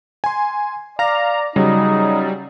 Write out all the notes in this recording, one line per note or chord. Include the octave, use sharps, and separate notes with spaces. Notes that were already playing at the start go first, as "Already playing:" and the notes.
G#5 C6
D5 F5 A#5 A#6
C#3 F#3 G3 D#4